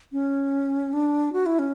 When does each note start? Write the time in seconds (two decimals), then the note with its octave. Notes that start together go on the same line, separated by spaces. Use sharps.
0.12 C#4
0.93 D4
1.33 F#4
1.46 E4
1.59 C#4